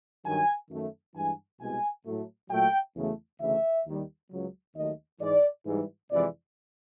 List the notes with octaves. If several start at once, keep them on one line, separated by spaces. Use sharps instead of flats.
G2 D#3 F#3 G#5
F#2 D#3 F#3 A3
G2 E3 G#3 G#5
C2 B2 G#3 G#5
A2 F#3 A3
A#2 F#3 A3 G5
E2 C#3 F#3 A3
D2 C#3 E3 A3 E5
D#2 D#3 G3
C#2 C#3 F#3
D#2 D#3 F#3 A3 D#5
G#2 E3 G#3 D5
G#2 E3 G3
F2 C3 E3 G#3 D5